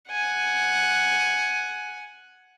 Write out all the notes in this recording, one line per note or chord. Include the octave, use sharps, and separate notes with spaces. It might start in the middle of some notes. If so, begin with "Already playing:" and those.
F#5 G#5